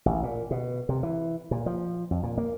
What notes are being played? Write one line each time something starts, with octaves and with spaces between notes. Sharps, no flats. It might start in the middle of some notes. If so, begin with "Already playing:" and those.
A1
A#2
B2
C3
E3
A#2
F3
F2
A#2
A#3